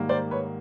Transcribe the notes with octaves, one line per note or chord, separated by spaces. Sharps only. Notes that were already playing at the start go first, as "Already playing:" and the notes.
Already playing: G#2 D#3 G3 A#3
C5 D5
B4 C#5